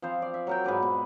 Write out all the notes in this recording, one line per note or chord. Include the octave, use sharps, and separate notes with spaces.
F3 C4 C5 F5
D5
E5
F#3 A#4 G5
G#2 B4 D5 G#5
B2